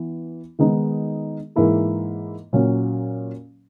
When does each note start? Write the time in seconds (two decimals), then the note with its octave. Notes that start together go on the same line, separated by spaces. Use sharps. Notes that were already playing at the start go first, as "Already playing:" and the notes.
Already playing: E3 B3
0.59 D#3 G#3 B3 D#4
1.56 G#2 E3 A#3 E4 G#4
2.53 A#2 F#3 C#4